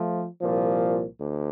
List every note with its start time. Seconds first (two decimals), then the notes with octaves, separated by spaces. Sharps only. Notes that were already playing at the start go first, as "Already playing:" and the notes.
Already playing: F3 A3
0.41 C2 A#2 F3
1.21 D2